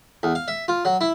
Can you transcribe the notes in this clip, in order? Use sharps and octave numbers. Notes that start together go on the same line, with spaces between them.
E2
F5
E5
F4
F#3
E4